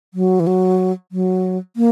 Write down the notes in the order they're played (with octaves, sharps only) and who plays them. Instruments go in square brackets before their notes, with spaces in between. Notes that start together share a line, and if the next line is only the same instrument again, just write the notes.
[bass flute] F#3
E3
F#3
F#3
A#3